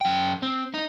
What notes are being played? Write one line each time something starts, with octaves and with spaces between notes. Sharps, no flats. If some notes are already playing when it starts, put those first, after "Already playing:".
F#2 G5
C4
D#4